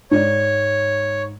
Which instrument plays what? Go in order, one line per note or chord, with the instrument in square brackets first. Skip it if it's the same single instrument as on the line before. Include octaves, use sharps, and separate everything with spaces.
[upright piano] G#2 D5 [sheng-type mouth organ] C#5